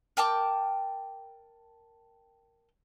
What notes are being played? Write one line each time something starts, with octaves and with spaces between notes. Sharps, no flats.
A#4 G5 A5 D6